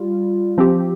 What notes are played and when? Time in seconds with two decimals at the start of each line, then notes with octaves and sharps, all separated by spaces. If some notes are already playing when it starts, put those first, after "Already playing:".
Already playing: G3 F4
0.58 F3 C4 G4